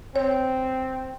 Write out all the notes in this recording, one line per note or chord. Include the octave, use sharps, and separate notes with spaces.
C4 C#5